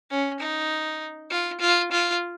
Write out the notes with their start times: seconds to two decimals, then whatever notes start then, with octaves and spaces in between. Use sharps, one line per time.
0.11 C#4
0.40 D#4
1.30 F4
1.60 F4
1.92 F4